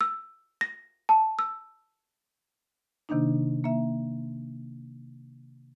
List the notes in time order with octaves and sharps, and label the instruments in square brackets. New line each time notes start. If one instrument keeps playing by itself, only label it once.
[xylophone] E6
A#6
A5
E6
[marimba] C3 D#3 A#3 D4 D#4
A#3 E5